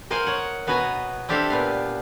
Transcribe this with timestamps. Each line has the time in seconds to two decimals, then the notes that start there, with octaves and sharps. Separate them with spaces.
0.10 A#4 C5 D#5 F5 F#5 G#5
0.27 C#5 F#5
0.67 B2 B3 F#4 B4 G#5 A#5
1.29 C4 D4 G4 A4 E5 F5
1.50 A#2 B3 F5